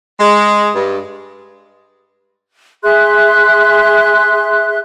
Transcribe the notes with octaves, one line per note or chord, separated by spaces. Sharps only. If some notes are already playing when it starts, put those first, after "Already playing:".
G#3
G2
G#4 E5 C6 F#6